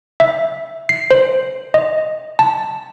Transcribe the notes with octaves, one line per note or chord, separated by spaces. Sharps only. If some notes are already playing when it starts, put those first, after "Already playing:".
E5
C7
C5
D#5
A5